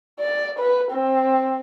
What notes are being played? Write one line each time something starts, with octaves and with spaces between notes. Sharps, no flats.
D5
B4
C4